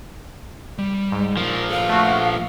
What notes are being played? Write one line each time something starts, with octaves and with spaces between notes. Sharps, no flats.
G3
G#2
A#2 F3 A#4
A4 B4 F5
A3 F#4